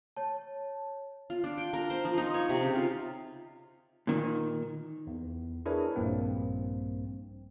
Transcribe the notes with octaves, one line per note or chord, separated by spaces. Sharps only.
C#5 A5
F4
D4
G5
A#4
C5
F3
D#4
C#5
C3
C#3
F4
A#2 D#3
E2
D4 E4 G#4 A#4 B4 C#5
A#1 G2 A#3 C4